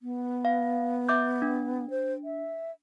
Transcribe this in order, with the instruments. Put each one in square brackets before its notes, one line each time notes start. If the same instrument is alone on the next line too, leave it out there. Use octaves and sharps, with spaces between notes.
[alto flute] B3
[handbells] F5
E5 D6 G6
D4
[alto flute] C5
E5